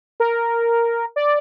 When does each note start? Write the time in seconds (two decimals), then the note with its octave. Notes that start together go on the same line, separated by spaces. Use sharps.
0.20 A#4
1.16 D5